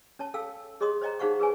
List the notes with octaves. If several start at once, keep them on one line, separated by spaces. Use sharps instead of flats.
C#4 C#5 A5
A4 F5 G5 E6
G#4 C#5 D#5 C6 D#6
C5 C#5 D#5 G5 A#5
D#4 G#4 C5 F5 F#5 C#6
G#4 B4 C#5 G#5